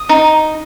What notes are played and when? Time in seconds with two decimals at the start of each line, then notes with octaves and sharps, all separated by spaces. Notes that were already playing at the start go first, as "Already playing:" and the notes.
Already playing: D#6
0.09 D#4